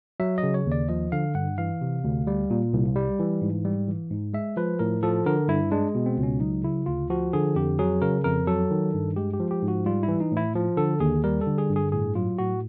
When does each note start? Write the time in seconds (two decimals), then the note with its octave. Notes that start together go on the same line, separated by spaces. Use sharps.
0.20 F#3 E5
0.38 D#5
0.43 C#3
0.54 C#5
0.66 D#2
0.72 D5
0.89 F3 D#5
1.12 D3 F5
1.35 G2 F#5
1.58 E3 F5
1.81 C3
2.04 D2
2.27 G3
2.50 A#2
2.73 C2
2.96 G3
3.19 E3
3.42 G#2
3.65 G3
3.88 E3
4.11 G#2
4.33 G#3 E5
4.57 F3 B4
4.79 A2 A#4
5.03 F3 A4
5.26 D3 A#4
5.48 G2 E4
5.71 G#3 D4
5.95 B2
6.06 C4
6.18 C#2
6.23 C#4
6.40 F#3 D#4
6.63 C#3 E4
6.86 D2 F4
7.10 F3 F#4
7.33 D3 G#4
7.56 F2 G4
7.79 F#3 G#4
8.01 C#3 A#4
8.24 F2 A#4
8.47 F#3 A4
8.71 D#3
8.94 G2
9.16 G#3 G4
9.33 G4
9.40 F3
9.51 G4
9.62 G#2
9.68 F#4
9.86 G3 F4
10.03 E4
10.08 E3
10.20 D#4
10.32 A2
10.37 E4
10.55 F3
10.77 D3 A4
11.00 D#2 G#4
11.24 G3 A#4
11.41 A4
11.47 D3
11.58 G#4
11.70 G2
11.76 G#4
11.92 A2 G#4
12.15 F#3 F4
12.38 A2 F#4